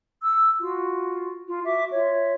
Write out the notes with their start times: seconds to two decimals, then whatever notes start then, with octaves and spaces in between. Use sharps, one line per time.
0.23 E6
0.60 F4 F#4
1.48 F4
1.64 F#4 E5 D6
1.92 F4 C#5 E5